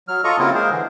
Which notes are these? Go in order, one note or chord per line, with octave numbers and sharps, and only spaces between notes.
F#3 F6
F4 A4 D#5 A#5 C#6
C#3 F#3 A#3 C4 E4 F4
G#3 A#3 G#4 A#4 C5
D3 E3